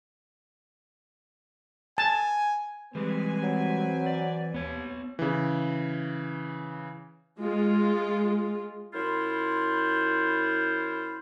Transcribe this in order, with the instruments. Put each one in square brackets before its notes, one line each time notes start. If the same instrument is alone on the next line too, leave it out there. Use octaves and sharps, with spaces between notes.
[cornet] G#5 [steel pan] A5
[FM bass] E3 [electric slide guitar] G3 G#3 [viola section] C4 B4 G#5
[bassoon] F#3
[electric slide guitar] D5
[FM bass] D#2 [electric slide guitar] B3 C#5
[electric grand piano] C#3 E3
[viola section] G#3 F4
[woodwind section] F#2 E4 F4 C5 B5